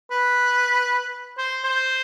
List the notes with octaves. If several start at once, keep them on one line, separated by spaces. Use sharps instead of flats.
B4
C5
C5